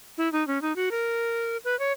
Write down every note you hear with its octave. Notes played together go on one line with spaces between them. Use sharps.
E4
D#4
C#4
D#4
F#4
A#4
B4
C#5